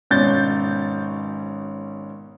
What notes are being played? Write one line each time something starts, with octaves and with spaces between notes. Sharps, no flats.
G#1 B2 C#4 G6 A6